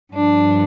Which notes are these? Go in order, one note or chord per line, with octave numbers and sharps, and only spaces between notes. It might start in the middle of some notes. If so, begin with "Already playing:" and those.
G2 F3 D4